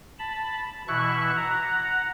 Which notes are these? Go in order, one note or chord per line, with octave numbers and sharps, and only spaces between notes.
A5 B5
B2 E3 E4 E5 C#6 F#6
F#5 A#5